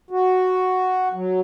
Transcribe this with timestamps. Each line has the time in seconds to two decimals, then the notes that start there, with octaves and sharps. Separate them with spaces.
0.11 F#4
1.13 F#3